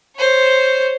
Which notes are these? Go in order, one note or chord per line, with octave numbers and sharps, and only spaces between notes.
C5 C#5